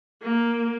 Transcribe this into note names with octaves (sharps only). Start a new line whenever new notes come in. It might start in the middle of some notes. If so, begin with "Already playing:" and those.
A#3